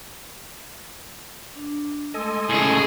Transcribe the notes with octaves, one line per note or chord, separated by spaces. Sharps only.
D4
G#3 A3 A4 D#5 G#5 C6
A2 C#3 G#4